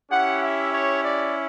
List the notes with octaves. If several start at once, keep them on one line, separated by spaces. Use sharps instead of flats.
C#4 E4 G4 F#5
E5
C#5
D5